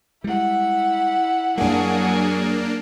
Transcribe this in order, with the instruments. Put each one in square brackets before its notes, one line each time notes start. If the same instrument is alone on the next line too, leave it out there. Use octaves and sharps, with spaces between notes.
[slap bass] G3 G#3 [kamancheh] E4 F#5
[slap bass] F#2 G3 [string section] F#3 G#4 [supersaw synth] A#3 D4